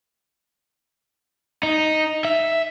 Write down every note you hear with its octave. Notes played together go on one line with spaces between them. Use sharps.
D#4
E5